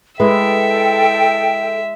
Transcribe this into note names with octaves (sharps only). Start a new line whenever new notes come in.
G#3 E4 A4 B4 E5 G5